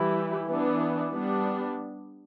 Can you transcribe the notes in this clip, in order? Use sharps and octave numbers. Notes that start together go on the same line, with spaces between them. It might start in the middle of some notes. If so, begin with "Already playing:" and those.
Already playing: E3 G3 E4 G4
E3 B3 D4
G3 B3 D4